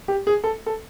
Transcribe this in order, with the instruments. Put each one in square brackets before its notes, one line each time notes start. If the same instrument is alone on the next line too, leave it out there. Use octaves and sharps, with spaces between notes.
[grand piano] G4
G#4
A4
A4